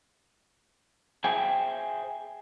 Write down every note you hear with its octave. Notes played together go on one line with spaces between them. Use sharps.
G#4 C5 E5 G5 G#5